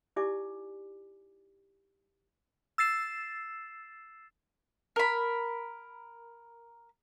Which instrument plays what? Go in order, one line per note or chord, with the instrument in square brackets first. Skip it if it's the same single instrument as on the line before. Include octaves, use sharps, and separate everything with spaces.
[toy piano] D#4 E4 G4 D5 G#5 D6
[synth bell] E6 A6 C7 E7
[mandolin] A#4 B5